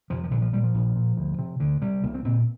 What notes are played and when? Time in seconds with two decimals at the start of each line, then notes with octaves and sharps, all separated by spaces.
0.10 F2 C3 F3
0.23 F3
0.31 A#1 D3
0.42 F3
0.53 A#2 G3
0.64 F3
0.74 A#1
0.96 A#2
1.17 D2
1.39 C3
1.60 D2 D3
1.82 C3 G3
2.03 C2 A#3
2.14 C4
2.25 A#2 C4